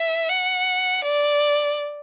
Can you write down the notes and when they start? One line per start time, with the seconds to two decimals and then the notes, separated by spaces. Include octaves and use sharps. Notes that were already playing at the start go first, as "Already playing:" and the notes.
Already playing: E5
0.30 F#5
1.05 D5